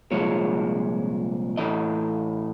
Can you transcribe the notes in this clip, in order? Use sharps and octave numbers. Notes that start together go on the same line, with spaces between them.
C2 A#2 F3 G#3 C#5
A2 E3 A3 D#5